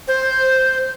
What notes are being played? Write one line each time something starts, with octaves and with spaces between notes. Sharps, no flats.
C5